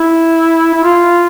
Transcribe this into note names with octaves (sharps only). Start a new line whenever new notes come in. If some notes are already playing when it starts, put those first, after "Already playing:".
Already playing: E4
E4
F4